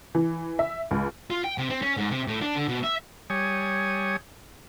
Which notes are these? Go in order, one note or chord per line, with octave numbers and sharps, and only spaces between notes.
E3
E5
C#2
F4
G5
C3
C4
C#4
G#2
C3
A2
D4
D3
B2
E5
G3 C#5 G#5 D#6